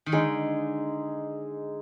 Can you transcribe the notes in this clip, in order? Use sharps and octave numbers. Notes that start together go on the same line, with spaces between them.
D#3
D3 G#3 D#4 G#4